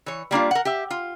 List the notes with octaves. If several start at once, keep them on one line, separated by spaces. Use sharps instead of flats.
E3 C#5
G3 A#3 D4 F4
A#4 F#5
G4 E5
F4